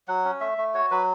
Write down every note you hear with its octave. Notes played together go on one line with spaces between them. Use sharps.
F#3 F#5
C#4
A3 E5
A3
F#4 C#5
F#3 B4